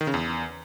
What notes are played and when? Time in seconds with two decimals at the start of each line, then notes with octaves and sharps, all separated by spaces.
0.01 D#3
0.07 C#3
0.14 E2